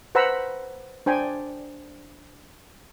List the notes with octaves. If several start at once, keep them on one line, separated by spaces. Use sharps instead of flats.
B4 C5 F#5 A#5 B5 E6
D4 C5 G5 G#5